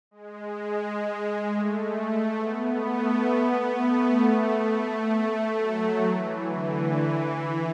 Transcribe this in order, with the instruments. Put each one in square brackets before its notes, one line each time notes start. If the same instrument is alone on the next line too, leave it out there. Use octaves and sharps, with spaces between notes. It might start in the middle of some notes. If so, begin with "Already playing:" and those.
[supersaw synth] G#3
A3
A3
B3
A3
B3
A3
A3
A3
F#3
E3
D3
E3